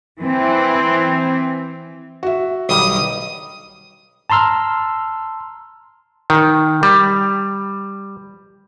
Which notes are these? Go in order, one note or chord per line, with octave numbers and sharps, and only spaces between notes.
E3 C4
F#4 E5
B1 D#3 G3 D#6
A5 A#5 C6 E6 F6
D#3
G3